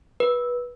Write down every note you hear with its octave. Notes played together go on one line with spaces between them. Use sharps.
B4